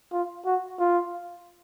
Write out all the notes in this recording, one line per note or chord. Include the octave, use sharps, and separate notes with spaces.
F4
F#4
F4